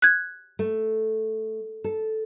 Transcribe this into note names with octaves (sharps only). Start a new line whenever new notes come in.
F#6 G#6
A3
A4